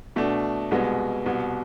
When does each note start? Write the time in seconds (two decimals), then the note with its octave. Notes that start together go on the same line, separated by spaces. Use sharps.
0.16 B2 A3 D4
0.71 C2 B2 G#3 B3
1.26 C2 B2 B3